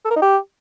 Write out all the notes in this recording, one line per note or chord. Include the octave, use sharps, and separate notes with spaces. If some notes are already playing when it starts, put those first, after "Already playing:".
A4
A#4
D#4
G4